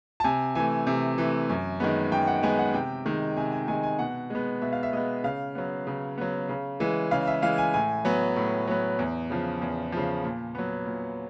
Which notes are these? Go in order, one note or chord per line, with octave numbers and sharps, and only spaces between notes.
A5
C3 G#5
E3 A3 G#5
C3
E3 A3
F#2
D#3 G#3 B3
F#2 G5
F#5
D#3 G#3 B3 G#5
F#5
C3 G5
D#3 G#3
C3 G#5
G#5
D#3 G#3 G#5
G#5
B2 F#5
G#3 B3
B2 E5
F5
E5
G#3 B3 D#5
C#3 F5
F#3 B3
C#3
F#3 B3
C#3
E3 G#3
C#3 F5
E5
E3 G#3 F5
G#5
A2 G#5
F#3 B3
A2
F#3 B3
E2
C#3 F3
E2
C#3 F3
A#2
F#3 B3
A#2